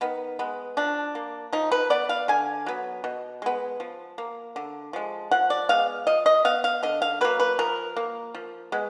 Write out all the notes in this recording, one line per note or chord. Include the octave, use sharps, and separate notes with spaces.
D#3 B3
G#3 B3
F3 D4
A#3
F3 D#4
B4
B3 D5
F5
D3 G#5
F#3 B3
B2
G#3 B3
F3
A#3
D3
F3 G#3
F3 F#5
D5
G#3 B3 F5
F3 D#5
D#5
B3 F5
F5
D3 D#5
F5
F#3 A#3 B4
B4
F3 A#4
A#3
F3
G#3 B3